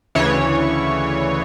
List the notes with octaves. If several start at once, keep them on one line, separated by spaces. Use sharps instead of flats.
D2 C#3 E3 C#5